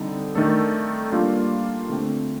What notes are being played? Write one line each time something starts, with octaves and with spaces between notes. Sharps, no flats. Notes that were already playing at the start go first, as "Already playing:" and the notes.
Already playing: D3 G3 C4 D#4 A4
D#3 A3 D4 A4
G3 A#3 D4 F4
D3 A3 C4